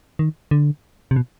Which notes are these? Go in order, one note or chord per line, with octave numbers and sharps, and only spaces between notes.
D#3
D3
C3
B2